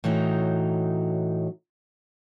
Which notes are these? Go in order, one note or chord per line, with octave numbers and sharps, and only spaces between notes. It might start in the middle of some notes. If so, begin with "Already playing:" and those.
A2 E3 F#3 D#4